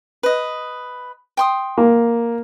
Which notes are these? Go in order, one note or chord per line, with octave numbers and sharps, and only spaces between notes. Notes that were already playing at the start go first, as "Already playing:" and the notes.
B4 D#5
G5 C6 D#6
A#3